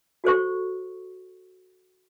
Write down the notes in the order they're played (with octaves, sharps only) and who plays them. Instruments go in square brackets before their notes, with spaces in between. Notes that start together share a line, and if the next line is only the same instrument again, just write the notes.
[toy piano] F#4 A4 C5 C#6